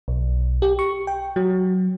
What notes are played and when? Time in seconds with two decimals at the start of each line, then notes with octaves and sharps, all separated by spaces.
0.08 B1
0.62 G4
0.79 C#6
1.07 G5
1.36 F#3